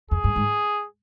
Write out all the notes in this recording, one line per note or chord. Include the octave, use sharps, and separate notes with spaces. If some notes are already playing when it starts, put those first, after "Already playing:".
F2 G#4
G2
G#2